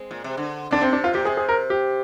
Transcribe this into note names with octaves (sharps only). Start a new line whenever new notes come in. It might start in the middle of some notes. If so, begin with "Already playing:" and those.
Already playing: G#3 C4
A#2
C3
D3
D3 D4
C3 C4
D4
F4
A#2 G4
C3 G#4
G#4
A#4
G4